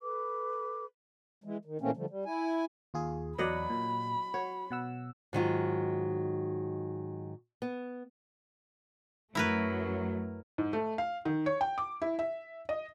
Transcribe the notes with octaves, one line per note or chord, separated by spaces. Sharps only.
A4 B4 D6
E3 G#3
D#3
A#2 E3 A3 A#3 C4 C#4
D3 F3 G3 A3
G3
E4 G#5
D#2 F4 G#4
E2 F#3 D5 D#5 F#5 B5
A#2
F#4 C#5
B2 F#5 E6
G#2 D#3 F#3 F4
B3
F#2 F#3 A3 E4 A#4 B4
G#2
A3
F5
D#3
C#5
G5
D6
E4
E5
D#5